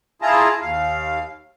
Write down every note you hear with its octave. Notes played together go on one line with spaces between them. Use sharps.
E4 F4 G#4 A5 A#5
D#2 F5